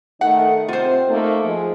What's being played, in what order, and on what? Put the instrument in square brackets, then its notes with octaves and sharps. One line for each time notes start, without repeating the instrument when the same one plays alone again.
[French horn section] D#3 A3 [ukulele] F#5
[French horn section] C3 C4 [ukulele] F4 C5
[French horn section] A3 A#3 D#4
F3 G#3